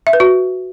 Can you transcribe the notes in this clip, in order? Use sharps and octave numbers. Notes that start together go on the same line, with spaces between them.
E5
B4
F#4